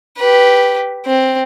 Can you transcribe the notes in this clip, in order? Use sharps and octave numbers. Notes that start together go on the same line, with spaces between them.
G4 B4
C4